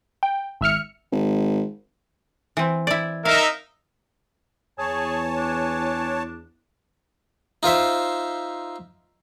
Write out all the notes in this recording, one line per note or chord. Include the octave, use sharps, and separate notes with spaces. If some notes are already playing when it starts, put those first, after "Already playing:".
G5
G#1 E5 F6 C#7
G#1
E3 C4
E4 D5
D#4 A#4 E5 F5
E2 G#4 C#5 G#5 A5
D4
D#4 F4 C5 E5